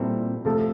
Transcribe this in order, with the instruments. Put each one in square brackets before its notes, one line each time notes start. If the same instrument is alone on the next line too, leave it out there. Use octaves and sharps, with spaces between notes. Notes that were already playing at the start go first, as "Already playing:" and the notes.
Already playing: [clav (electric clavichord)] A#2 G3 C4 E4 A4
[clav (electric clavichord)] C3 F3 A3 [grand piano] A4